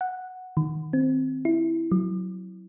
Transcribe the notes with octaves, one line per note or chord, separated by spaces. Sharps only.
F#5
D#3
C4
E4
F#3